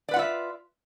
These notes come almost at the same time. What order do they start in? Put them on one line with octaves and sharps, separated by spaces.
D5 B4 F#5 F4 E5